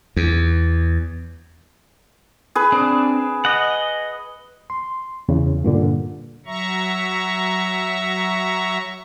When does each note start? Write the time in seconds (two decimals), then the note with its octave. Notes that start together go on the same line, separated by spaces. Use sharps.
0.16 E2
2.55 G#4 B4
2.72 C4 D4
3.45 D#5 F#5
4.70 C6
5.29 E2 C#3
5.64 G2 A#2 D3
6.46 F#3 E5 A#5 C#6